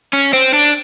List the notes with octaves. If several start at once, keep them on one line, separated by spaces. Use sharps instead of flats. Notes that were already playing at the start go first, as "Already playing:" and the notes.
C#4
C4
D4